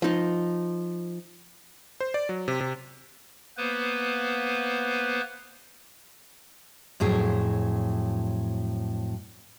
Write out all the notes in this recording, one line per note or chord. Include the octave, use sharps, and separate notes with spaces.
F3 D#4
C5
D5
F#3
C3
C3
A#3 B3 B4 C5
F2 A2 F#3 G#4